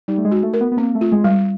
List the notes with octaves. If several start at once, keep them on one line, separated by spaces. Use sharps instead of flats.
G3 D#4
A3
G#3
F#4
A3
A#4
B3
B3
A#3 C4
A3
F4
G#3
G3